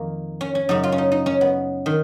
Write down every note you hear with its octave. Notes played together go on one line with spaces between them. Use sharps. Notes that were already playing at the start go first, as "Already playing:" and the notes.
Already playing: F2 D#3 A#3
C#4
C#4
F#2 C#3 D#4
F4
C#4
D#4
D#4
C#4
B3
D#3